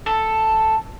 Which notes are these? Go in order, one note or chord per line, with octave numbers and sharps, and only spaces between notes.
A4